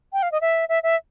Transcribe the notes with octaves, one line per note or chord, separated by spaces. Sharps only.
G5
F5
D#5
E5
E5
E5